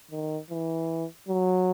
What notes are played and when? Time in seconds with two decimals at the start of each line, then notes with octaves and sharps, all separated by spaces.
0.11 D#3
0.51 E3
1.28 F#3